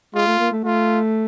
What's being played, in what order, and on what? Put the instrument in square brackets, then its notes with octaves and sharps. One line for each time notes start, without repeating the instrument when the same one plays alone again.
[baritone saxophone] G#3 [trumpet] F4
[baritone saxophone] A3
A#3
A3
[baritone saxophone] A3 [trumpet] F4